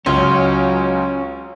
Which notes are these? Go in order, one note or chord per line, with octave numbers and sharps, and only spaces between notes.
C#2 F#3 C#4 F4